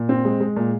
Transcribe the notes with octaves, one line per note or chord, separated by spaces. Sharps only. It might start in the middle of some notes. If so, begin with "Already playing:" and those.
Already playing: A#2
C4
G#3
G#3
A#2